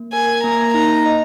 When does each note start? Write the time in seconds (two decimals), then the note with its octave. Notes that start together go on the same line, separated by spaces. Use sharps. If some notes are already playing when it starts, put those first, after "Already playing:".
Already playing: A#3
0.13 A#4 G#5
0.44 A#3 A#5
0.74 D#4 A#5
1.06 D#5